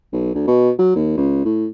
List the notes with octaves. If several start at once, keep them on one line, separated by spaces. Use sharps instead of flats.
B1
D2
B2
F#3
D#2
C#2
A2